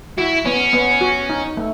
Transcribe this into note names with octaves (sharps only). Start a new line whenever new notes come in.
E4 F#4
B3 C#4
B3
F#4
D#4
A3